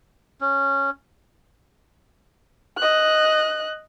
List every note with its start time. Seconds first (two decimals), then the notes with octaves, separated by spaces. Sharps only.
0.41 C#4
2.78 D#5 F#6